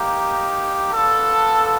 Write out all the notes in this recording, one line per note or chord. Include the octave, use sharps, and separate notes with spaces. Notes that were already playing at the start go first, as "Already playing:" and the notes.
Already playing: A#3 D#4 G4
B3 D4 F4 A4